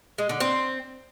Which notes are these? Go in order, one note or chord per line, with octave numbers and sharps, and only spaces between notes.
G#3
D3
C4